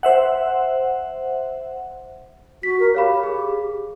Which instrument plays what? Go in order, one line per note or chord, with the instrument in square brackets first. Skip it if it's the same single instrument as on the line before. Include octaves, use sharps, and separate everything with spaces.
[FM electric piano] C5 E5 F#5
[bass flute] F#4 [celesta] B6
[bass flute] A#4
[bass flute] G4 [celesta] C#5 F5 B5
[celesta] G#4